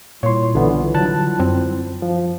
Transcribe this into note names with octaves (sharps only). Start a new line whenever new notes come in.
A#2 G3 E4 F4 C#5 C6
B1 D3 E3 B3
D3 F#3 A5 F#6
F#2 C4
F3